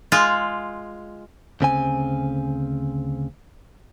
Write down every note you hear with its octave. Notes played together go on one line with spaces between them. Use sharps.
G#3 F4
D2 C#3 C4 G#5